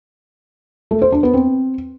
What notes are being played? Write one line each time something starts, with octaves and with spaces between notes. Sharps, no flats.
A3
C5
D4
B3
C4